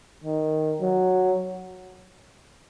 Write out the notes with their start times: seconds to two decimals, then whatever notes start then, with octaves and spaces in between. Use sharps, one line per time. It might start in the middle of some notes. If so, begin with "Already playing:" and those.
0.24 D#3
0.81 F#3